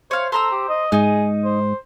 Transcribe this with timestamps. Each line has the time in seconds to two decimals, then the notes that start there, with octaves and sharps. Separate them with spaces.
0.11 C5 C#5 F5
0.32 A4 C5 A#5 E6
0.52 G4
0.69 D#5
0.92 G#2 D#4 G#4 D#5
1.45 C5